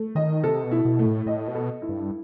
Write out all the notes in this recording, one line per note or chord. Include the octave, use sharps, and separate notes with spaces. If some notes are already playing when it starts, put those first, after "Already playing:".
Already playing: A3
D#3 D#5
C3 A4
B2
E4
B2
A3
A2
A2 D#5
B2
A4
E4
G2